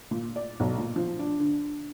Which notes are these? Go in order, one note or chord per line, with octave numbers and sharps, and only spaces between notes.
A#2
D5
B1
A#2
F3
D4
D3